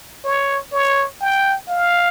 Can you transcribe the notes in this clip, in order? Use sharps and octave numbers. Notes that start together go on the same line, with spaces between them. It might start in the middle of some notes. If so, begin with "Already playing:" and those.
C#5
C#5
G5
F5